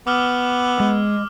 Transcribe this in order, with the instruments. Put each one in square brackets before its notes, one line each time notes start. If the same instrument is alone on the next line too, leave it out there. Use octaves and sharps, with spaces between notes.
[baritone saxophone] B3 [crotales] D6 E6 F6
[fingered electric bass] G#3